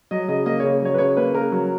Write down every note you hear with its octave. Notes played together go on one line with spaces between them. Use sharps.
F#3 D#5
C#3 D#5
A#3 D#5
C#3 C#5
F#3 C#5
B4
C#3 C#5
A#3 B4
C#3 A#4
F#3